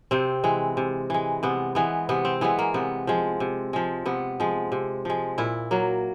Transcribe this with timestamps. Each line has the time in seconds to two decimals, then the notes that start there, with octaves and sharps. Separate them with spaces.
0.11 C3 C4
0.44 E3 G#3
0.77 C3
1.10 E3 G#3
1.43 C3 B3
1.75 E3 G#3 B3
2.09 C3 B3
2.25 C4
2.41 E3 G#3 B3
2.59 A#3
2.74 C3 B3
3.07 F3 G#3
3.40 C3
3.73 F3 G#3
4.06 C3 B3
4.40 F3 G#3
4.72 C3
5.05 F3 G#3
5.38 A#2 E4
5.71 F#3 A#3